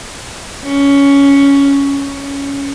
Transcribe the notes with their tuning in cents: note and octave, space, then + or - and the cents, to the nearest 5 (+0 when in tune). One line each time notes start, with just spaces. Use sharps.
C#4 +10
C#4 +10